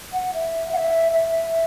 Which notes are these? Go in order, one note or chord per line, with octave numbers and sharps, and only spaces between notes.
F#5
E5
F#5
E5
E5